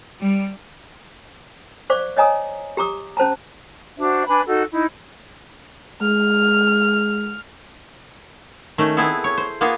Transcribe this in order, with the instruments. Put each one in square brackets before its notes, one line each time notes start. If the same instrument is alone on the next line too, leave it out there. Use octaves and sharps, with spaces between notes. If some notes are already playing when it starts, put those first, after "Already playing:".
[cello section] G3
[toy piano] C5 D5 F5 C#6 D6
C#5 D#5 G#5 A#5 D#6
G4 A#5 D6 D#6
C#4 C5 A5 A#5
[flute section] D4 F#4 C5 E5
D4 B4 G#5 B5
D#4 F#4 A4
D#4 E4
[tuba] G#3 [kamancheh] F6
[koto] D#3 A3 C#4
B3 C4 E4 G#4 A4
C#5
C5
A#3 B3 F4 G#4